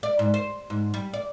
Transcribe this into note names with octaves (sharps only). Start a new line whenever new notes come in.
D5
G#2
C5
G#2
G3
D5